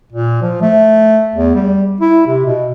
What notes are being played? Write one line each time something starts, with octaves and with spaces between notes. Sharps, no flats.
A#2
F3
A3
E2
G3
E4
C3
B2